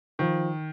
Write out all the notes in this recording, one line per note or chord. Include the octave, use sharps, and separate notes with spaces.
D#3 F3